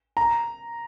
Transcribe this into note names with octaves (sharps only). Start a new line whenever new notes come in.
A#5